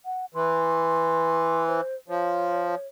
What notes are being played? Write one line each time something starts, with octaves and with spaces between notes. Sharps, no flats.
F#5
E3 C6
C5
F3 C#5